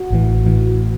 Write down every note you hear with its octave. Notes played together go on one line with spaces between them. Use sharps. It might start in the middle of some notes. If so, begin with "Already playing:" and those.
Already playing: F#4
A1 A2 E3
A2 E3